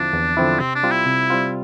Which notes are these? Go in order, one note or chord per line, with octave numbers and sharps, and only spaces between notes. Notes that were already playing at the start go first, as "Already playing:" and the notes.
Already playing: E2 D3 F3 C4 D4 E4
E2
D3 F3 C4 E4
C3 C4
D4
G3 C4 F4
E4
C3
G3 C4 F4